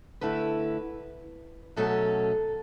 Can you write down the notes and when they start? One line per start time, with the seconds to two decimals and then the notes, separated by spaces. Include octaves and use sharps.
0.21 D3 A3 E4 B4
1.76 B2 F#3 A3 C#4 A4